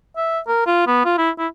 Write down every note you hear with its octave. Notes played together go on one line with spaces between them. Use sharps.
E5
A#4
F4
B3
F4
E4
E4